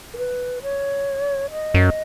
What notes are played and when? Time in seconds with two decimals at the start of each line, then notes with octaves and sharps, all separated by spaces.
0.14 A#4
0.17 B4
0.62 C#5
1.52 D#5
1.74 F#2